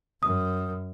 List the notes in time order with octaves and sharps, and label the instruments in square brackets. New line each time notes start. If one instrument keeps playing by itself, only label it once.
[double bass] F#2 [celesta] D#6